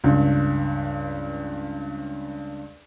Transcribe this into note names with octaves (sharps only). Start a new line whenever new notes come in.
C#2 G2